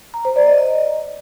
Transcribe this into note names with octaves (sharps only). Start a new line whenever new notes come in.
A#5
C5
D5
D#5
D#5